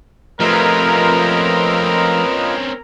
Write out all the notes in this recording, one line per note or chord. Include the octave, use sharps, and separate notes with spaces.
F3 A3 C4 C#4 F4 A#4 B4 D#5